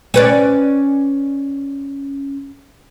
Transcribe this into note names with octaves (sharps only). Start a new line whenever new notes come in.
C#4 B4 D5